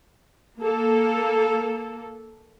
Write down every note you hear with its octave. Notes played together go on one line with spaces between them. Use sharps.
A#3 A4